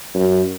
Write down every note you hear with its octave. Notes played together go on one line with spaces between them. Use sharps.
F#2